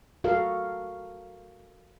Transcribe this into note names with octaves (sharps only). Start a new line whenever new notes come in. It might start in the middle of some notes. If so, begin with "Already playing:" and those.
F#4 A4 A#4 F5